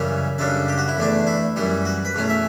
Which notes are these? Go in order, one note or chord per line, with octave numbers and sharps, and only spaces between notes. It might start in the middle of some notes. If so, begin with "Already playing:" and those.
Already playing: F#2 C#3 E3 G3 C#4 E5
F#2 C#3 G3 D4 A4
G4
F#4
E4
E2 D3 A3 D4
E4
F#2 E3 G3
F#4
B4
E2 B2 A3 C#4
E5